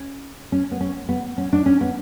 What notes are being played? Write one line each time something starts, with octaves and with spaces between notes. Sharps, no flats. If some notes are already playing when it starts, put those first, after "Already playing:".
Already playing: C#4
C#4
B3
C#4
B3
C#4
D4
C#4
B3